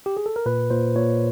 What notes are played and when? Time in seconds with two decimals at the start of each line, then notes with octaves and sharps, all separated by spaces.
0.06 G4
0.17 G#4
0.26 A4
0.36 A#4
0.46 A#2 B4
0.70 A#2 C5
0.96 A#2 C#5